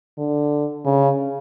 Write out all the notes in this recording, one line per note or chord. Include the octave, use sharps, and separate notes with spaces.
D3
C#3